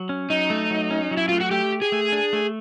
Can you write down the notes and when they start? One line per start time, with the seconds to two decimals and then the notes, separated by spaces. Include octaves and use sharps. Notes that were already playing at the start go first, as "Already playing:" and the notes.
Already playing: F#3
0.09 C#4
0.30 F#3 D#4
0.50 A3
0.71 F#3
0.90 C#4
1.11 F#3
1.17 E4
1.29 A3 F4
1.40 F#4
1.51 A3 G4
1.72 G4
1.82 G#4
1.92 A3
2.12 D4
2.33 A3